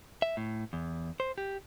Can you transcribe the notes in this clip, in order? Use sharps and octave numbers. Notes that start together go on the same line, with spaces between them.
E5
A2
E2
C5
G4